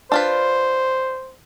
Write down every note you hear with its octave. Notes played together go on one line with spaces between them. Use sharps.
D4 F4 B4 C5